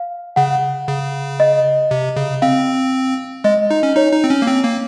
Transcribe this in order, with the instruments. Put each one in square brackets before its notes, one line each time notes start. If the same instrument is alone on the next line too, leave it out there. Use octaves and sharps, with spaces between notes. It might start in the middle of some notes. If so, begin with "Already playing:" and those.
Already playing: [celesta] F5
[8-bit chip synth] C#3 [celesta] F#5
[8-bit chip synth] C#3
[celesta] D#5
[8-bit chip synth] C3
C#3
[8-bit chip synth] C4 [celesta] F5
[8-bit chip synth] G#3 [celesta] D#5
[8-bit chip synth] D#4
C#4
[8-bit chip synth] D#4 [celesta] C#5
[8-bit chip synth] D#4
C4
C#4
A#3
C4
A#3